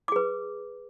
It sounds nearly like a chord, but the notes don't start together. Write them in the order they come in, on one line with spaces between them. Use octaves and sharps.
D6 G#4 B4